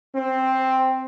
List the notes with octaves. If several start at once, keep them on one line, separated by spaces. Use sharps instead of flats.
C4